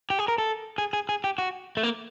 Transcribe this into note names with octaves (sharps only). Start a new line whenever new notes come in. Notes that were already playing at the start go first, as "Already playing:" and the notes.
G4
G#4
A#4
A4
G#4
G#4
G#4
G4
F#4
A3
A#3